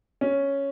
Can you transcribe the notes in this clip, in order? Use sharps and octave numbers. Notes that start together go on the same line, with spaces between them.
C#4